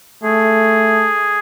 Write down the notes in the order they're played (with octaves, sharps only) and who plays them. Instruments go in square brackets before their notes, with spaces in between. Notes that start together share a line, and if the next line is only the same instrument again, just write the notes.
[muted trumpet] A3 [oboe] G#4